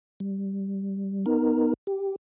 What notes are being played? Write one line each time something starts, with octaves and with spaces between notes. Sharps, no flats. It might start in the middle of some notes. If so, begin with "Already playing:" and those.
G3
B3 D#4 A#4
G4